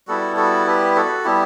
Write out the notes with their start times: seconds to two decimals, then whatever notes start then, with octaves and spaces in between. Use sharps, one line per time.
0.07 G3 B3 E4 F#4 A4
0.37 F#4 A4
0.67 G4 B4
0.96 F#4 A4
1.24 G3 B3 E4 G4